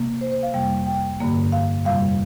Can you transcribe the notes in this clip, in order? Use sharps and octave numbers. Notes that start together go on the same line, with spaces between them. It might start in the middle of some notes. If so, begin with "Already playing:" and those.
Already playing: C3 A#3
C5
C5
F5
F2 C3 G3 A#3 G5
G5
G2 D3 A#3
F5
F2 C3 G3 F5